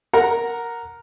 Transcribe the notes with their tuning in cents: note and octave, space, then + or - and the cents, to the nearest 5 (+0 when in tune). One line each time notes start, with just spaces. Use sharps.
A#4 +0 F#5 -5 A#5 +0